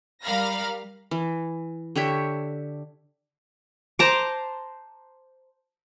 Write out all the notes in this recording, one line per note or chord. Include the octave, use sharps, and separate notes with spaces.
G3 A#4 F5 B5 F6 A#6
E3
D3 G4 C#5 E5
C5 A5 A#5 D6